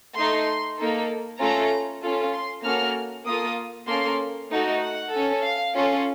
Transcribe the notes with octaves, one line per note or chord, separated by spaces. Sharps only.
A3 D#4 A4 C6
A#3 D#4 A4
A3 C#4 F4 A4 A#5
C#4 F4 A4
C6
A#3 C#4 F#4 A4 F6
A#3 F4 A4 D#6
A#3 C#4 A4 C6
A3 D#4 F#4 A4
F#5
C#4 A4
F5
C#4 F4 A4